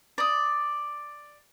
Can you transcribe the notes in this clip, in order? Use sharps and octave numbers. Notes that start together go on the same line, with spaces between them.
D5 D#6